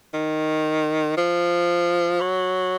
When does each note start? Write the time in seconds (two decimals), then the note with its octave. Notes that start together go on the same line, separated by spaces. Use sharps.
0.14 D#3
1.17 F3
2.21 F#3